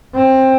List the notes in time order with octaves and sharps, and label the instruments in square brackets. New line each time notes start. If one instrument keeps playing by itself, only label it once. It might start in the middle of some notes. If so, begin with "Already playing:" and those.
[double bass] C4